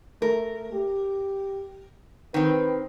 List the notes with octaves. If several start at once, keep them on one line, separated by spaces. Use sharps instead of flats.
A3 A#4
G4
D#3 C4 B4